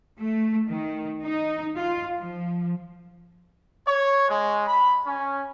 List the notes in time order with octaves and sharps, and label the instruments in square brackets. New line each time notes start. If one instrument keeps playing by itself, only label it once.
[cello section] A3
D#3
D#4
F4
F3
[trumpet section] C#5
G#3
B5
C#4